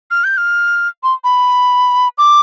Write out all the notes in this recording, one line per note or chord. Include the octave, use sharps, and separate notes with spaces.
F6
G6
F6
C6
B5
D6